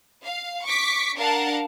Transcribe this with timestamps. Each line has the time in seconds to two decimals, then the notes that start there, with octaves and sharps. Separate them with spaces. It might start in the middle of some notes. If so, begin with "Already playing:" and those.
0.23 F5
0.65 C#6 D6 B6
1.17 D4 A#4 F5 F#5 A5